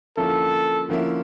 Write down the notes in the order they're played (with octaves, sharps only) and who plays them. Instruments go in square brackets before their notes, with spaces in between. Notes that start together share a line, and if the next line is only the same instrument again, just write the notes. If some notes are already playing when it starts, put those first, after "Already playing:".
[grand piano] D3 F3 A#3 C#4 E4 [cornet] A4
[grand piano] D3 F3 A#3 C#4 E4